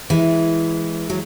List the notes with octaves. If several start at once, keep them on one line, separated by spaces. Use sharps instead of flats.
E3 G#3
F#3